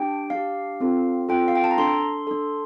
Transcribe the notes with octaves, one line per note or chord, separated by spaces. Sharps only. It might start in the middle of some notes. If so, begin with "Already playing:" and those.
Already playing: D4 G4 G5
D4 G4 F5
C4 F4 A4
C4 F4 A4 G5
F5
G5
A5
A#5
D4 A4 C6
D4 A4